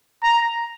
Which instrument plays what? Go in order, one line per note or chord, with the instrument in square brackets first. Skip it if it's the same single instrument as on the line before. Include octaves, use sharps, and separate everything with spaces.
[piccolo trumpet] A#5